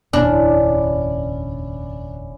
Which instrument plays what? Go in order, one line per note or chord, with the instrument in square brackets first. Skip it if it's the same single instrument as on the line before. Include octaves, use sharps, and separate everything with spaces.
[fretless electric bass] F1 D#2 A#2 [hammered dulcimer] C#4 E4 D5 [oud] D4